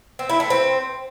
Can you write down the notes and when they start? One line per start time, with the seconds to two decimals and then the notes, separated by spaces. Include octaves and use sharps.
0.19 C4
0.30 E4
0.40 A3
0.50 C4